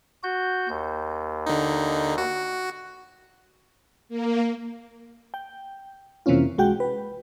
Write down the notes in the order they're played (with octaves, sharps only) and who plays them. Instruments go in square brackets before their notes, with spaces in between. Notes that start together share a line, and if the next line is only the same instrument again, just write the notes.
[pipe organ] F#4 G6
D#2
[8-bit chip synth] D3 D#4
F#4
[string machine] A#3
[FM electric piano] G5
F2 C3 E3 A#3 C#4 F4
B1 G#3 F#4 G5
B4